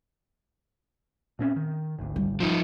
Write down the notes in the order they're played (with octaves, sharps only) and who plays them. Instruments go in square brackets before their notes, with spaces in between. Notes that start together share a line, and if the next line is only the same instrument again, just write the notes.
[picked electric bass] A#2 C4 C#4
D#3
G#1 D2
[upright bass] G3
[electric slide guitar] F3 D#4